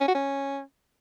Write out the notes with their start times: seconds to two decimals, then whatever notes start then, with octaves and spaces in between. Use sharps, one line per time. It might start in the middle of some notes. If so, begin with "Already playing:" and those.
0.01 C#4
0.08 F#4
0.15 C#4